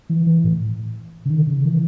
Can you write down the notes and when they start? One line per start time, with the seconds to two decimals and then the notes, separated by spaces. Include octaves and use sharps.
0.09 E3
0.26 E3
0.44 A2
1.25 C#3
1.30 D#3
1.47 C#3
1.65 E3